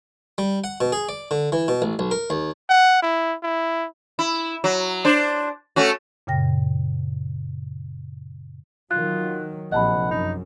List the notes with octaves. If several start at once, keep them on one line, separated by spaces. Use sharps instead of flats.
G3
F#5
B2
G#4
D5
D3
E3
B2
A1
B1
A#4
D#2
F#5
E4
E4
E4
F#3
D4 C5
A3 C#4 F#4
F#2 A#2 C#3 G5 A#6
D#3 F#3 F4 F#6
A#1 C3 D#5 F#5 A5 B5
F#2 D#4